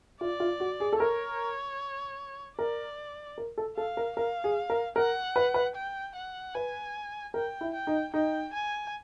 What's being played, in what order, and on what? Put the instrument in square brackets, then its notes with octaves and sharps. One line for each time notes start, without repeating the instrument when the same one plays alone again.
[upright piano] F4 [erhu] D5
[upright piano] F4
F#4
G#4
A4
[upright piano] A#4 [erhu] C#5
[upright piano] A#4 [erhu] D5
[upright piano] A#4
A4
[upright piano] A4 [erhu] F5
[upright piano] A#4
[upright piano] A#4 [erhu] F5
[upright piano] G#4
A#4
[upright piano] A#4 [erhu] F#5
[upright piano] B4
B4
[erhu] G5
F#5
[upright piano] B4 [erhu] G#5
[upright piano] A#4 [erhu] G5
[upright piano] E4
[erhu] G5
[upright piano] D#4
[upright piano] D#4 [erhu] G5
[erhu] G#5